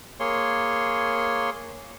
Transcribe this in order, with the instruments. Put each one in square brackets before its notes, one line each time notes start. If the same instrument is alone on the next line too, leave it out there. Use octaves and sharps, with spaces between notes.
[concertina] A#3 G#4 C#5 C6